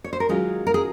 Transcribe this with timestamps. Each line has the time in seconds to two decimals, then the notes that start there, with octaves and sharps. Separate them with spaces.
0.04 C#5
0.13 C5
0.20 A#4
0.29 D#3 F#3 G#3 C#4 F4 G#4
0.67 A#4
0.74 G#4